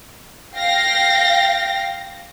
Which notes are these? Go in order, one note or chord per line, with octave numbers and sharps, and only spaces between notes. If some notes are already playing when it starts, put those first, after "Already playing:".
F5 G5 A#6